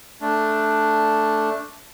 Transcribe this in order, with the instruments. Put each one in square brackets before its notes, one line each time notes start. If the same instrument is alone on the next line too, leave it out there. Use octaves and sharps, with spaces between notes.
[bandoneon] A3 D4